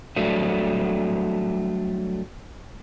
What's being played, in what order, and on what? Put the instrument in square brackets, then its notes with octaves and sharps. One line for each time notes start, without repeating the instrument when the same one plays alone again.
[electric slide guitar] F#3 G3 A3 D4